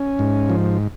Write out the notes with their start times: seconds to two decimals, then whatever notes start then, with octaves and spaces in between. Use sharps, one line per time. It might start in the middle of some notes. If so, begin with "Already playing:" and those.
Already playing: C#4
0.19 G#2
0.50 F3